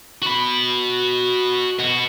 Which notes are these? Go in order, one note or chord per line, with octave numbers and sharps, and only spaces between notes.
F#4 B5
B2 F#4